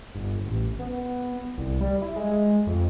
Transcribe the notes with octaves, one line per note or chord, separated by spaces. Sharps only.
G1
A1
B3
C2
G3
E4
G#3
F2